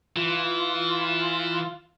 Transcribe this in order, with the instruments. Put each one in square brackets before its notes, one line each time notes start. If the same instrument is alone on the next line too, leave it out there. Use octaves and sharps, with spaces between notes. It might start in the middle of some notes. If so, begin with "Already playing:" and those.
[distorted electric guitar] E3 [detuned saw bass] F4